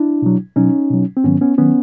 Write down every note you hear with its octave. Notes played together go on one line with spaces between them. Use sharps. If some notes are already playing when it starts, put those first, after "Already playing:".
Already playing: D4 E4
B2 F#3
B2 F#3 C#4 D#4
B2 F#3
C4
G#2 D#3 F#3 B3 C#4
B3 C#4
D#3 F#3 B3 C#4